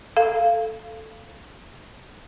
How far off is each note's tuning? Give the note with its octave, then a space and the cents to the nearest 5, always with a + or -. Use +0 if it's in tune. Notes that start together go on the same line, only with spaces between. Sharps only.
A4 +0 F5 -15